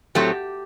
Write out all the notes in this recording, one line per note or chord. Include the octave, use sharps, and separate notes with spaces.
A2 F#3 A3 C4 G4